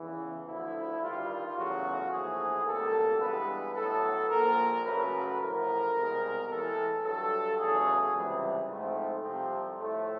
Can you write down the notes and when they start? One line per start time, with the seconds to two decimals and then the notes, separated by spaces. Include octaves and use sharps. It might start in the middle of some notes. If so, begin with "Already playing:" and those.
Already playing: E2 C#3 E3
0.47 D2 D3 F3 E4
1.02 G2 D#3 G3 F4
1.56 E2 C#3 F#3 A3 F#4
2.11 A#1 G#2 E3 A3 G#4
2.66 C#2 B2 G3 A#3 A4
3.20 G2 E3 G#3 B3 B4
3.76 A2 F#3 B3 A4
4.30 A#1 A#2 F3 A#3 A#4
4.85 F#2 C#3 F#3 A3 B4
5.40 A1 A2 F3 A#4
5.94 C2 B2 G#3 B3
6.49 A2 E3 G#3 A4
7.04 G2 D3 F#3 A4
7.59 E2 C#3 F#3 A3 G#4
8.13 C#2 C3 E3 G3 C4
8.68 G#2 F3 A3 C4
9.23 C2 C3 F3 A3 C4
9.77 A2 F3 A3